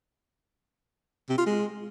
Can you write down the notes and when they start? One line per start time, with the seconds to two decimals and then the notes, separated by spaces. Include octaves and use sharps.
1.30 C3
1.38 F4
1.46 G#3